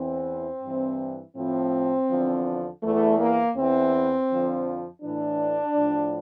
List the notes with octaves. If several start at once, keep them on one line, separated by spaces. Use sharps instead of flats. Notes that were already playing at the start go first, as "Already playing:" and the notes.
Already playing: E2 E3 C4
G2 E3
A2 F3 C4
E2 D3 F3
E2 E3 A3
A#3
E2 E3 C4
F2 D3 F3
A2 E3 D4
A2 F3